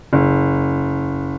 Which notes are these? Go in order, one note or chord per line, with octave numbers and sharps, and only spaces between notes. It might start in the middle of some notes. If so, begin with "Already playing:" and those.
F#1